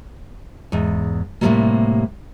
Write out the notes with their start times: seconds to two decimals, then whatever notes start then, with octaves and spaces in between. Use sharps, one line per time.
0.72 E2 G#2
1.41 A2 C3 E3 F#3 G3 A#3